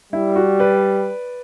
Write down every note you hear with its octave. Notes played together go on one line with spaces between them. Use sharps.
G3 E4
F#4
B4 D5